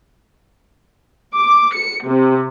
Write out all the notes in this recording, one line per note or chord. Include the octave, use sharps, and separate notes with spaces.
D6
C#7
C3